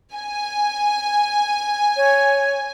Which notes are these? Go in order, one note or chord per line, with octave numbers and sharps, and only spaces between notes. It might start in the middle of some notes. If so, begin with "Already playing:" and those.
G#5
C#5